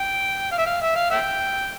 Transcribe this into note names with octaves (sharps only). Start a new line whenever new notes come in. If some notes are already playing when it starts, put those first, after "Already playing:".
Already playing: G5
F5
E5
F5
E5
F5
E5 G5